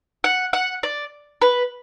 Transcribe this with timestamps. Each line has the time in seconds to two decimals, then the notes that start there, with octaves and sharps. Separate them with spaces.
0.24 F#5
0.53 F#5
0.83 D5
1.42 B4